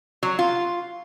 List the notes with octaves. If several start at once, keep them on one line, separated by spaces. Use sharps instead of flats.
F#3
F4